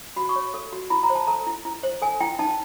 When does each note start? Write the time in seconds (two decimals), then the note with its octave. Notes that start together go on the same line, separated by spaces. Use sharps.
0.16 F#4 B5
0.29 C#6
0.36 C#5
0.54 A4
0.72 F#4
0.90 E4 B5
1.03 A#5
1.10 C5
1.15 A5
1.27 A4 A#5
1.47 E4
1.65 E4
1.83 C5
2.02 A4 G#5
2.20 E4 G5
2.39 D#4 A5